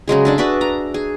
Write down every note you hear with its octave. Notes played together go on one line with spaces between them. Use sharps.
C#3 F#3 G#3 G#4
D4 G#4 A4
F#4 B4 D5 E5
A#5
G#4